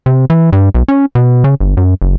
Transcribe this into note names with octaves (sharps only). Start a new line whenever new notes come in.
C3
E3
G2
B1
C#4
B2
C#3
G1
F#2
F#1